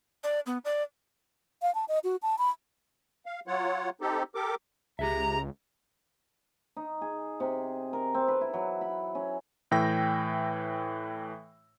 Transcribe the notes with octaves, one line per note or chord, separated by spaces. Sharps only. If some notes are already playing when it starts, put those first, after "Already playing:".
D5
B3
D5
F5
A5
D#5
F#4
A5
B5
F5
F#3 F4 C#5 F#5
C4 D#4 G4 A4
G4 A4 A#4 D6
C#2 G4 G#4 E5 A#5
D#4
G#4
C3
A#4
C4
B4
E4
F#3
B5
C#4
A2 E3 G5 E6 A#6